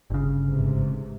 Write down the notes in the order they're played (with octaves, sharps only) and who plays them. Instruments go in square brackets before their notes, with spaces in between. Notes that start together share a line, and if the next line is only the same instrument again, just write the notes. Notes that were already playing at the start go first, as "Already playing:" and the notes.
[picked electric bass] G1 C#3
[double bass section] A1 G#2 C3